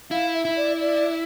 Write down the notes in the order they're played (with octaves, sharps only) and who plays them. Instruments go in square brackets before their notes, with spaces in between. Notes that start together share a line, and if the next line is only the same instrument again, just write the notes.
[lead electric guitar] E4 [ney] F5
[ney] E5
[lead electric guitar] E4
[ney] D5
D5